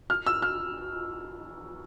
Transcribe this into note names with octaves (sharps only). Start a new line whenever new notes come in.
F6
E6
F6